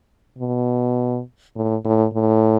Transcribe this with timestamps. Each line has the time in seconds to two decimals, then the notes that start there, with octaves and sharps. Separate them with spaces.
0.38 B2
1.55 A2
1.85 A2
2.14 A2